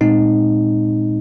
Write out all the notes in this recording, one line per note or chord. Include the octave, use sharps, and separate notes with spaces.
A#2 G#3 C4 D#4